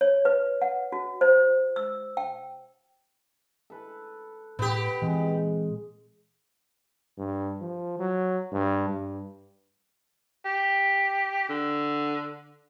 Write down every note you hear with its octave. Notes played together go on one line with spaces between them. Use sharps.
C#5
B4
F#5
F#4
C5
E6
G5
A4 B4
A2 B3 G4
A#2 E3 G#3 C4
G2
F3
F#3
G2
G2
G4
D3